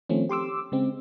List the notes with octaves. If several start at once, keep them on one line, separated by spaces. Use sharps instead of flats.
D#3 F3 A3 C4 C#4
G4 C6 D6 E6
C#3 G#3 C4